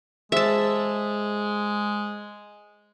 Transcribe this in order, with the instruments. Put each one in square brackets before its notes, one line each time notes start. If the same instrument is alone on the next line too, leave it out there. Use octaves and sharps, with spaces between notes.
[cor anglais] G#3 [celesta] G#4 C5 E6 [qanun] E5 A5